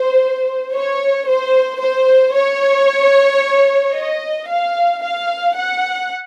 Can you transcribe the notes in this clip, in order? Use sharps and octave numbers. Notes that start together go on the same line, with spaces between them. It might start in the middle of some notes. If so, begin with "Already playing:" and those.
Already playing: C5
C#5
C5
C5
C#5
D#5
F5
F5
F#5